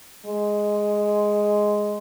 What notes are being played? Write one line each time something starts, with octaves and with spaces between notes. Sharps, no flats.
G#3